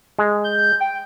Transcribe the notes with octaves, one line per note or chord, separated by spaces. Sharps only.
G#3
G6
G5